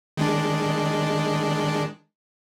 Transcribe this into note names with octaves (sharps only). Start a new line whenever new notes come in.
D#3 G#3 D4